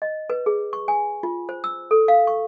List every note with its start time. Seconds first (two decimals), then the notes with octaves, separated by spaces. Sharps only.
0.02 D#5
0.30 B4
0.46 G#4
0.73 C#6
0.88 G#5
1.23 F4
1.49 C5
1.64 E6
1.91 A4
2.08 F5
2.27 C#6